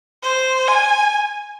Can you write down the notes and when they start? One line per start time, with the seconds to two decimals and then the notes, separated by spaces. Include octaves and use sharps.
0.23 C5
0.68 G#5